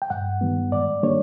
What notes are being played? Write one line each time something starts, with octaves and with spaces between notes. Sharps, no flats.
G5
G2 F#5
D#3 G3 B3
G#2 D5
D#3 G3 A#3 D4 C#5